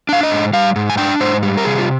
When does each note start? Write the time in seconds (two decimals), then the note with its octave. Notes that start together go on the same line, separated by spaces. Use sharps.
0.09 D4 F5
0.23 D#5
0.31 G#2
0.53 G3 F5
0.76 G#2
0.90 G#5
0.98 D4 G5
1.20 G#2 C5
1.43 G3
1.57 A#4
1.65 C3 G#4
1.78 F4